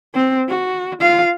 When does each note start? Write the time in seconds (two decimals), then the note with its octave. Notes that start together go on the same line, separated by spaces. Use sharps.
0.14 C4
0.49 F#4
1.00 F4 F5